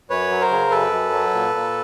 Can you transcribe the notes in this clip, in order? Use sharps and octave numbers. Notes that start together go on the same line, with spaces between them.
F#2 B4 C#5
F#3
A#4 C5
C#3
F#2 A4 B4
F#2
F#3
A#2
A#2